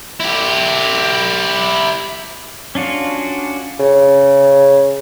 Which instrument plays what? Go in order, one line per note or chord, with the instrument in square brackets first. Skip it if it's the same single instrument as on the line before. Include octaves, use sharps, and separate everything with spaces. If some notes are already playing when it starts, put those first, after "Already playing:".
[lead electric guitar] E4 G4
[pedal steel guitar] C#4 D4 F4 F#4
[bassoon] C#3